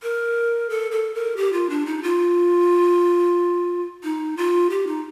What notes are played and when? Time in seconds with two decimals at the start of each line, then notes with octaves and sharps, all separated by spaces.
0.03 A#4
0.70 A4
0.91 A4
1.14 A#4
1.37 G4
1.52 F4
1.70 D4
1.86 D#4
2.03 F4
4.03 D#4
4.37 F4
4.70 G4
4.87 D#4